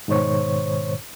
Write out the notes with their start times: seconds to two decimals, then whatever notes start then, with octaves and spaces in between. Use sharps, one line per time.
0.08 G#2 B2 D#3 C5 C#5 C#6